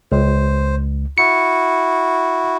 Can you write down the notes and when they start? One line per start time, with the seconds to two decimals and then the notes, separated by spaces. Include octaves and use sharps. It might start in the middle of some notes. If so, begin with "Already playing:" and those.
0.12 C#2 C5
1.18 E4 F#4 C#7